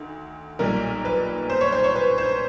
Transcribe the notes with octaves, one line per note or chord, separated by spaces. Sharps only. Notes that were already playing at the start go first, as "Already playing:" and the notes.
Already playing: D2 D#3
B1 A#2 G3 A#4
B4
C5
C#5
C5
C#5
B4
C5